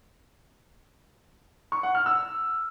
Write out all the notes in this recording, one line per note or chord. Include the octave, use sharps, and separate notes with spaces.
C#6
F#5
F6
E6